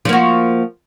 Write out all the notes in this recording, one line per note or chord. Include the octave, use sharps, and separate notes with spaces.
F3 A#3 F#4